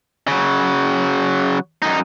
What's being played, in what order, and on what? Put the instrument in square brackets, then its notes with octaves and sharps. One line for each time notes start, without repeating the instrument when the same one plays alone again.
[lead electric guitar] C#3 F#3
F#2 D#4